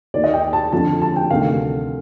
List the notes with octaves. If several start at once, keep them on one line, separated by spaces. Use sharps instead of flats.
D#2 D#3 D5
D#5
G5
A5
F2 D3 F3 A5
A5
G5
D2 C3 D#3 F5